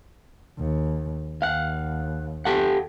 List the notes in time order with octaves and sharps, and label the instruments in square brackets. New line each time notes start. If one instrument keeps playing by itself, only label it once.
[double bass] D#2
[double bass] D#2 [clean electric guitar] F5 F#5
[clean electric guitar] G4 A4 F#5